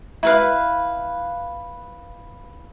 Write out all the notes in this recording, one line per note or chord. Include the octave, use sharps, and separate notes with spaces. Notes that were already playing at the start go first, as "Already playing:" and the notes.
E4 B4 F5